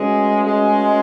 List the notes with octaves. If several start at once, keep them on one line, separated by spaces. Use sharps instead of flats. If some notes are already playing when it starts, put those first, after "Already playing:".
Already playing: G#3 A3 C#4 F#4 B4
G#3